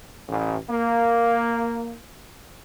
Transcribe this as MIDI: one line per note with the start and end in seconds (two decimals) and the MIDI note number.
0.28 0.56 33
0.69 1.97 58